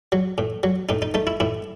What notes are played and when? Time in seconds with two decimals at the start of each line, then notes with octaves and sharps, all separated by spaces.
0.12 F#3
0.38 A2
0.63 F#3
0.89 A2 D#4
1.02 D#4
1.14 A3 D#4
1.27 E4
1.40 A2 E4